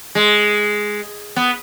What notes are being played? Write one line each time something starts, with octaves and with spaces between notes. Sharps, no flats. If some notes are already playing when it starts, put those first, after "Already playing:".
G#3
B3